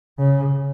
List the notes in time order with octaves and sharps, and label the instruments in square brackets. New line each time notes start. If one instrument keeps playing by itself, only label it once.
[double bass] C#3